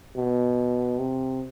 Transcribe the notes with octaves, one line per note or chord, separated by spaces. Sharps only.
B2
C3